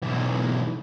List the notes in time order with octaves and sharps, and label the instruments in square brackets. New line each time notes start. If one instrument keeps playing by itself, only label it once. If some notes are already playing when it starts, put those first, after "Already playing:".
[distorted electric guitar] B1 E3